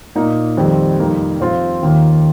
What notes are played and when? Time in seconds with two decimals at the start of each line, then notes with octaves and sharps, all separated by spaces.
0.15 A#2 A#3 D#4
0.57 F2 D#3 G3 C4
0.99 F2 C3 G3 A#3 D#4
1.40 F2 F3 C4 F4
1.83 D#2 D#3 A#3 F4